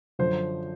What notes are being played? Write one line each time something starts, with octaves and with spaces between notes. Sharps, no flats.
F#2 D3 F3 C5